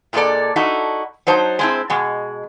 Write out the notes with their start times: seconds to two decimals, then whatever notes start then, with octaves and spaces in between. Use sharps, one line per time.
0.13 A#2 G#3 A3 E4 A4 D5
0.56 D#4 E4 F#4 A4
1.27 F#3 D#4 C5 A5
1.59 G#3 C4 E4
1.90 B2 G#3